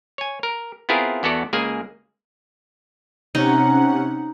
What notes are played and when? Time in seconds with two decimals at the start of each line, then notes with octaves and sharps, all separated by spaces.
0.18 C#5 G#5
0.43 A#4
0.89 B3 C4 E4 F4 G#4 A#4
1.23 E2 B3 F#4 A4 D5
1.53 C#2 A#3 G#4 G#5
3.35 C3 C#4 D#4 F#5